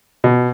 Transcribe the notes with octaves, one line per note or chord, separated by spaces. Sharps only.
B2